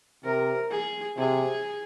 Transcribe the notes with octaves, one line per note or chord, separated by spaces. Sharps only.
C3 A#4
G#4
C3 G#4